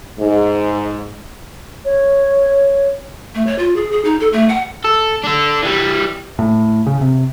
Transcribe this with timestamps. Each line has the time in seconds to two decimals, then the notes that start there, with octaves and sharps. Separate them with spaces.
0.19 G#2
1.85 C#5
3.35 A3
3.47 C#5
3.58 F4
3.76 G#4
3.91 G#4
4.04 D#4
4.20 A4
4.33 A3
4.49 F#5
4.84 A4
5.24 D4 A4
5.63 E3 G3
6.39 A2
6.86 C#3
7.01 C3